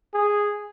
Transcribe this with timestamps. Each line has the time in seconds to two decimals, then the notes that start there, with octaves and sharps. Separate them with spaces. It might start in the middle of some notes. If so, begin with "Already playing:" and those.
0.14 G#4